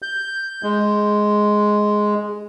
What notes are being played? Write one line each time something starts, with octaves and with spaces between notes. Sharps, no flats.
G6
G#3